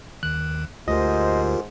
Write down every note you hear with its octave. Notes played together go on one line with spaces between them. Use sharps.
D#2 D#3 F#6
D2 G#2 F4 G4 A#4 C5 D#5